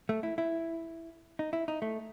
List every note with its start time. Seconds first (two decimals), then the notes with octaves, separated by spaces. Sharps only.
0.09 A3
0.23 E4
0.38 E4
1.39 D#4
1.53 E4
1.68 D#4
1.82 A3